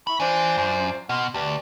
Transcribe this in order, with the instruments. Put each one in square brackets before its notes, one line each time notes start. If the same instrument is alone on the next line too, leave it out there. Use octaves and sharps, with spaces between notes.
[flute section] E4 C#6 [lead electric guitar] B5
[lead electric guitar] E3 [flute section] D4 F4 C5
[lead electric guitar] F#2
[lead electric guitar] B2 [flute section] F#5 C6 F6
[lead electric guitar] D2 [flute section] G4 B4 D5